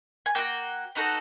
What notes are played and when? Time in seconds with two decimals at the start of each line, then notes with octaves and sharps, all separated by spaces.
0.26 G#5
0.35 A#3 D#4 F#4 G5
0.95 B3 D#4 F#4 A4